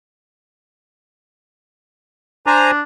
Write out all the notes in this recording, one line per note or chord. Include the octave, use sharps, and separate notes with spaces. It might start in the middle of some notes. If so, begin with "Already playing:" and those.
D4 C5 G#5 A#5